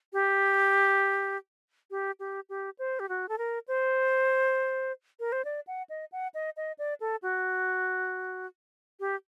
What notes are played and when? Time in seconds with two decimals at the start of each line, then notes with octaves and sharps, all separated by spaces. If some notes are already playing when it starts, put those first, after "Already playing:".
0.13 G4
1.91 G4
2.20 G4
2.49 G4
2.79 C5
3.00 G4
3.09 F#4
3.29 A4
3.38 A#4
3.68 C5
5.20 A#4
5.32 C5
5.45 D5
5.67 F#5
5.90 D#5
6.12 F#5
6.34 D#5
6.57 D#5
6.79 D5
7.00 A4
7.22 F#4
9.00 G4